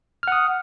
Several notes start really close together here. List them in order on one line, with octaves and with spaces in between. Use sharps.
F6 F#5 D#6